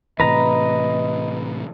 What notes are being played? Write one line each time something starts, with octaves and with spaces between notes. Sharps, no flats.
A2 C3 E3 B4 D#5 A#5